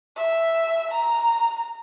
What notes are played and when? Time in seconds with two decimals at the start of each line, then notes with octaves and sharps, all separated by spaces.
0.16 E5
0.91 A#5